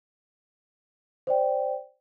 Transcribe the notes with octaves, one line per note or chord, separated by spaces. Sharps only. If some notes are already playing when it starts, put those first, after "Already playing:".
C5 D5 G5